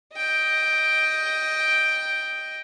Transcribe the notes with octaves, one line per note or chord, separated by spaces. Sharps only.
D#5 G5